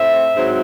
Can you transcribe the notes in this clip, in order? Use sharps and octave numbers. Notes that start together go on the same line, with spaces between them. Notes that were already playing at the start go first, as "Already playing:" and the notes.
Already playing: A2 C4 E5
G#2 F#3 C4